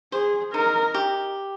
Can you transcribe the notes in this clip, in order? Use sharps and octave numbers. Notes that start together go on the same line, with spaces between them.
G#4 C5
D#4 A#4
G4